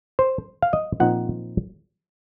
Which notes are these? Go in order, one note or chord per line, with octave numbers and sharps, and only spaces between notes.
C5
F5
D#5
A#2 F3 C4 D#4 F#5